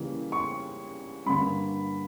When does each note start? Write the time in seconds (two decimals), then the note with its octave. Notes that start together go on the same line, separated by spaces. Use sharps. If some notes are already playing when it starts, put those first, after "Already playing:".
Already playing: C#3 E3 G3 A#3
0.32 C#6
1.26 G2 D3 A#3 B5